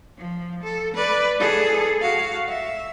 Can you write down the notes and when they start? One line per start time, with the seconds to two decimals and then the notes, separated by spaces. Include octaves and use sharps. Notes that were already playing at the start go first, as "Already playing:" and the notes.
0.18 F3
0.63 A4
0.95 B4 D5
1.39 G#4 A4
2.02 F#4 F5
2.48 E5